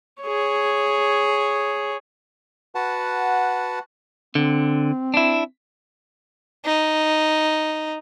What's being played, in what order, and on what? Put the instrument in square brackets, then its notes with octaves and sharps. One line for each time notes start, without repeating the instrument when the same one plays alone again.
[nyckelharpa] G#4 C#5
[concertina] F#4 B4 F#5 A5
[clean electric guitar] D3 [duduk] C4
[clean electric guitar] D4 E4
[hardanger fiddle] D#4